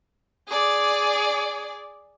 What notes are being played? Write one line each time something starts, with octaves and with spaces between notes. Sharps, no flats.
G#4 D5